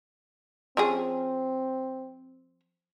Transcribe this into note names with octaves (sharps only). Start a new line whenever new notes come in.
F3 C4 C#4 G#4